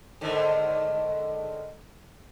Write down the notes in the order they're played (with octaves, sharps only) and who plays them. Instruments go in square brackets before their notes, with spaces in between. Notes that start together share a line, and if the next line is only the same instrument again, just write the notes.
[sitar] G#2 D3 D#3